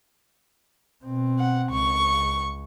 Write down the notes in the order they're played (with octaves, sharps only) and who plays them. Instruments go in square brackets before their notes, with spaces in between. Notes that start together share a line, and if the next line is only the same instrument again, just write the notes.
[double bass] B2 C4
[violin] F#5
[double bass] C#2 [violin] C#6